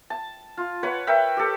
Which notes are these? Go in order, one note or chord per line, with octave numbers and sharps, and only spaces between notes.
A5
F4
B4 C#5 F#5
A#4 B4 E5 G5
G4 A4